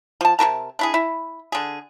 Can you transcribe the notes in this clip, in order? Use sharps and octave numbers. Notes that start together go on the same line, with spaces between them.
F3 A5
C3 F4 A#4 A5
D4 E4 G#4
E4
D3 G#4